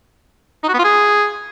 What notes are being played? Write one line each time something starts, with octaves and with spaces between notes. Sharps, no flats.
D#4
F#4
B3
F4
G#4